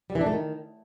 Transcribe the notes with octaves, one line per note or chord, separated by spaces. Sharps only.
G3
E3
D4
A3
D#3